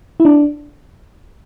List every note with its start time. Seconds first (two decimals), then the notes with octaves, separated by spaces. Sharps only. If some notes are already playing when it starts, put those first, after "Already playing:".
0.20 E4
0.25 D4